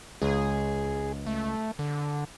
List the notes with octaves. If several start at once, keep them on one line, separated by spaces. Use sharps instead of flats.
C#2 G#4
A3
D3